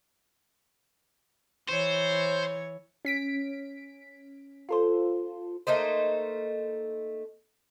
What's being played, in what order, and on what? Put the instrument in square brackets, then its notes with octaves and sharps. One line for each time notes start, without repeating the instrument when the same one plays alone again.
[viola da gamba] E3 C#5 [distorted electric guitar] C5
[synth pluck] C#4 B6 D7
F4 A4 C5
[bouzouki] A3 A#3 D#4 C5